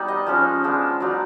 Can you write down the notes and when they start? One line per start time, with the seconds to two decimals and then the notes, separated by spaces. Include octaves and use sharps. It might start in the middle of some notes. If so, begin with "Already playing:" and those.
Already playing: G3 B3 D#4
0.08 D#5
0.27 F3 G#3 C#4
0.64 F3 G#3 B3 D4
1.00 F#3 B3 D#4 D5